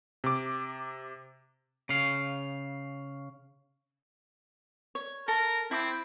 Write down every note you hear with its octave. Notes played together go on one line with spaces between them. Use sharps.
C3 D6
C#3 F5
C#5
A4 A#4 A#5
C4 E4 D6